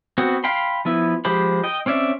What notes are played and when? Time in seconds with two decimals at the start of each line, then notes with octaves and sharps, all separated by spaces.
0.18 B3 C4 F#4
0.44 F5 G5 B5 C6
0.85 F3 B3 E4
1.25 F3 G#3 G4 C5 B5
1.64 D#5 G5
1.86 C4 C#4 D5 E5